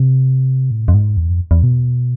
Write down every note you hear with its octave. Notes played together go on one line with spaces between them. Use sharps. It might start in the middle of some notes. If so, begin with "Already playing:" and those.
Already playing: C3
A2
F2
G#2
E2
F2
E2
B2